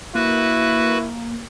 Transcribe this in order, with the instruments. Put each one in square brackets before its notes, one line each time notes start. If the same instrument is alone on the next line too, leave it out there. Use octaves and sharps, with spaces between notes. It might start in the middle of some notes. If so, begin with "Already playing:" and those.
[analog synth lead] A#3 [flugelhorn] E4 [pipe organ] F#4 B4